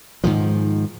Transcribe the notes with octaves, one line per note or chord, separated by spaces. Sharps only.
G#2 D#3 F3